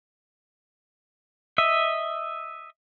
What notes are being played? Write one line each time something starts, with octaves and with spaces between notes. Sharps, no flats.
D#5 E5